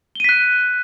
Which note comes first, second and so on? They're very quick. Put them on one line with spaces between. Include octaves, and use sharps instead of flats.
G7 D#7 B6 F#6